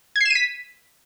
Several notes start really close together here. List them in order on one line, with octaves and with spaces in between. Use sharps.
G#6 C7 E7 D#7 B6